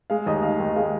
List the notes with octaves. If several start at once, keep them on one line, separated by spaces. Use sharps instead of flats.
G#3 F5
D#2 D#5
D#3 F5
D#2
G#3 F5